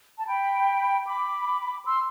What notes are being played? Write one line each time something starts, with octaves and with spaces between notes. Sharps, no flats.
A5
G5 B5
B5 D6
C6 E6